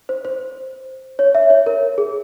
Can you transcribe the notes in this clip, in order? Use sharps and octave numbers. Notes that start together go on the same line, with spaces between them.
C5
C5
C#5
E5
C#5
A#4
G#4